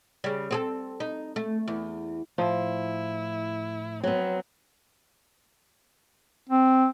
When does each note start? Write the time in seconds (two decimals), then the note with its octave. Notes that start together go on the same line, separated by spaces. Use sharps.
0.24 C#3 G3
0.51 C4 G#4 A4
1.00 D#4
1.36 A3
1.68 E2
2.38 A2 F3 E4
4.04 F#3 B3 C4
6.49 C4